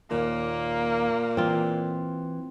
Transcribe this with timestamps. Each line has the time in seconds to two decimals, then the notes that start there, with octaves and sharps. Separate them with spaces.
0.11 D#2 A#2 A#3
1.37 E3 C4 F4